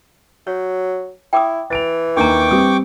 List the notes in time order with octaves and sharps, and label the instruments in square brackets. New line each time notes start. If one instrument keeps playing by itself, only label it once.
[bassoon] F#3 [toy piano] C#5
[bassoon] E4 [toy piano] G5 D6 D#6
[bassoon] E3 [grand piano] A6 D7 F7
[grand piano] D#2 D#4 A#4 [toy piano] D4 A#5 [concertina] G5 C#6 D6
[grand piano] G3 C4 G4 [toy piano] D#6